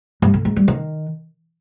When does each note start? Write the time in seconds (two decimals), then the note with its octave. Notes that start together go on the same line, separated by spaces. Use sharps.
0.22 G2
0.34 D3
0.45 G#2
0.56 G3
0.68 D#3